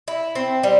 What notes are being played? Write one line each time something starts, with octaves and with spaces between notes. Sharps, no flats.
E4
C4
G3